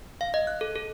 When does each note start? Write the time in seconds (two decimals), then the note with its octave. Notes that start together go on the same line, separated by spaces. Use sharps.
0.21 F5
0.34 D#5
0.47 F#6
0.61 A4
0.76 A4